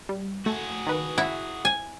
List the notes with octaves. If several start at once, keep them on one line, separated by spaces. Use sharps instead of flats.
G3
A3 F#4 G#4
D#3 B4
E4 F#5
G#5